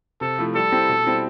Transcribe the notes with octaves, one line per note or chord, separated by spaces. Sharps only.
C3 A4
F3 A3 E4
G3 A4
C4 E4 G4
B2
G3 C4 E4